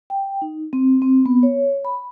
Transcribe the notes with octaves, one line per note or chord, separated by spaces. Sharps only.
G5
D#4
C4
C4
B3
C#5
B5